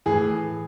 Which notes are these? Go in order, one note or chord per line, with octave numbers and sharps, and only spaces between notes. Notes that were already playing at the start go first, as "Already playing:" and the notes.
A2 E3 G#4